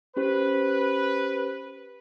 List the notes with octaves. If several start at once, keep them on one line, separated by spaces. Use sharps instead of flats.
C#4 G4 B4 C5